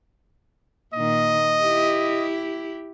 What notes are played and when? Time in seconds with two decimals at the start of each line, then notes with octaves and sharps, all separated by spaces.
0.94 A#2 D#3 D#5
1.62 E4 G4